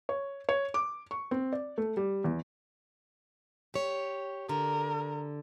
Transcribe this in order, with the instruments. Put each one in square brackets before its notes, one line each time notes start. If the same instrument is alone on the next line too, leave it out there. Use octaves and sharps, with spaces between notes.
[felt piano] C#5
C#5
D6
C#6
C4
D5
A3
G3
E2
[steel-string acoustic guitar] G4 C#5
[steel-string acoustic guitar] D3 [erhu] A#4